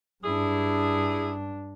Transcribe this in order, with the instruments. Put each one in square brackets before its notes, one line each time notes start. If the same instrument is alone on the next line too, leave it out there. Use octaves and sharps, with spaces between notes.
[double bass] G2 D4 [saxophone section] E4 G#4